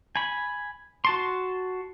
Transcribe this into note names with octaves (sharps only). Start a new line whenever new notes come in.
G#5 B5
F#4 A5 C6